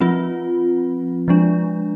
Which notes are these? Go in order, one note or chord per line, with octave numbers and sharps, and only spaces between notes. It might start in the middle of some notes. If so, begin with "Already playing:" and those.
F3 C4 F4
F3 G#3 D4